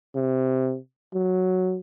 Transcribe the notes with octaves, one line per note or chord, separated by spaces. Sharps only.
C3
F#3